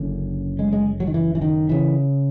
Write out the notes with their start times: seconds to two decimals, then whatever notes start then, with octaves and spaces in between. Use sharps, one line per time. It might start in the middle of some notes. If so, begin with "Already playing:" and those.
Already playing: F#1 F#2 D3
0.59 G#3
0.73 G#3
1.00 F#3
1.07 D#3
1.14 E3
1.35 E3
1.42 D#3
1.69 C#3 E3